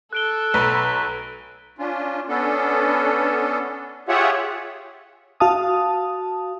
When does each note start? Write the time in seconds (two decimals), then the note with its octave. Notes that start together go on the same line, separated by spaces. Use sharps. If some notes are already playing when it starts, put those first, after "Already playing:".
0.13 A4 F#6 D7 G7
0.54 B1 B4 A#5
1.78 C#4 D4 F4
2.28 B3 C#4 D4 A4
4.08 F4 G4 G#4 C#5 E5 F#5
5.40 F#4 F5 A5 D#6